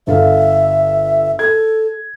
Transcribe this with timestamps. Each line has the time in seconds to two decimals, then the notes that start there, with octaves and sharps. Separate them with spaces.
0.07 G1 A4 E5 F5
1.39 A4 G#6